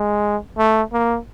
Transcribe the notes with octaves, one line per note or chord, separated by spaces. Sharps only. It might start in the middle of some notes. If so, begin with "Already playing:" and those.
Already playing: G#3
A3
A#3